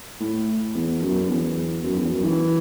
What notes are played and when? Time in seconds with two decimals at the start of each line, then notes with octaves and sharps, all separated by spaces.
0.20 A2
0.75 E2
1.02 F#2
1.29 E2
1.84 F#2
1.97 E2
2.11 F#2
2.24 E3